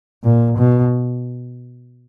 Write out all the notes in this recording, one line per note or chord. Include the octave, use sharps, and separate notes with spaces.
A#2
B2